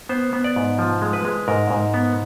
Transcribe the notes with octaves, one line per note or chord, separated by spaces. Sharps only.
B3 C5
B3
D5
G#2
F3
G#3
B4
G#3
G#2 A#4
G#2
B3